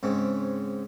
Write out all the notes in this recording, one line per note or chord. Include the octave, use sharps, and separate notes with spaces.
G#2 C#3 C4 C#4